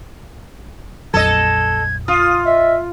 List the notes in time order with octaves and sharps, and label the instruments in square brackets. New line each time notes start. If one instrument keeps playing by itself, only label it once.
[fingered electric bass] A#1 F2 F#3 [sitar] A4 D#5 [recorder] G#6
[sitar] F4 [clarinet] D#6
[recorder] D#5 [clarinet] E5